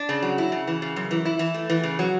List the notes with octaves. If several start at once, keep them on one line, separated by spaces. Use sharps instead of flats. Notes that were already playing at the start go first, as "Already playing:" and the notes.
Already playing: D4
C#3
F#3
E4
C#3
E3
C#3
F#2
E3
E4
E3
A3
E3
C#3
F#3